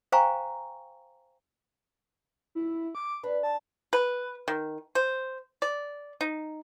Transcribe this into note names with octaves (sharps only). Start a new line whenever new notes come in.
C5 F5 G5 G#5 A#5 C#6
E4
D6
D4 B4
A5
B4
D#3
C5
D5
D#4